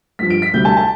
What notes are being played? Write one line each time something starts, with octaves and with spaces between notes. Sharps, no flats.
G2 F3 B6
D7
B6
D2 C3 G3 G6
A5
A5